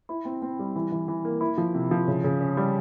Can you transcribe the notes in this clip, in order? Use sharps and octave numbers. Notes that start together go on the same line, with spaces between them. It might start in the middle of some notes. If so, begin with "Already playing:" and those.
E4
C4
C4
G3
E3
E3
E3
A#3
E4
F3
C3
F3
C#3
C#3
C#4
G3